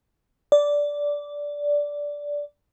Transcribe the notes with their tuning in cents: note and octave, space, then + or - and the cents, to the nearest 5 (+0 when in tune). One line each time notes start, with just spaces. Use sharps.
D5 -10